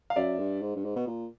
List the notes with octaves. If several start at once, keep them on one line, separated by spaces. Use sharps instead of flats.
F5
F#2 D5 E5
G2
G#2
G2
G#2
B2
A#2